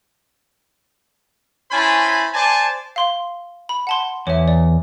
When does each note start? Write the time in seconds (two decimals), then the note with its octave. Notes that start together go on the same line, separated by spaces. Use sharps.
1.71 C#4 E4 C5 G#5 A5 B5
2.34 C5 D5 G#5 A5
2.96 F5 C6 G7
3.69 B5
3.87 F#5 A5 C6
4.27 E2 C#5 E5
4.48 D5